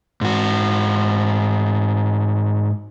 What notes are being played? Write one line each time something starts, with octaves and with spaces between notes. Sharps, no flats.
G#2 F#4